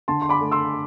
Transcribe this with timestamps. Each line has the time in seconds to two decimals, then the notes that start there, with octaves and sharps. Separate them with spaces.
0.08 D3 A5 C6
0.22 C6
0.29 B5 D6
0.41 A3
0.52 C6 E6